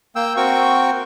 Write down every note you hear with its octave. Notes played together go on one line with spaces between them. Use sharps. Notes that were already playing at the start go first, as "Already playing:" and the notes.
A#3 G5 E6
C4 F#4 A#4 G5 C#6